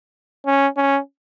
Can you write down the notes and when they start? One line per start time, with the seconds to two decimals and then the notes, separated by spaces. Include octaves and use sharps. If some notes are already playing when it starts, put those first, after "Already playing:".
0.46 C#4
0.77 C#4